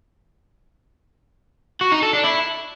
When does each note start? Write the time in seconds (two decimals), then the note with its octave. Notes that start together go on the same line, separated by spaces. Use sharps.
1.81 F#4
1.92 D#4
2.03 A4
2.13 D4
2.24 E4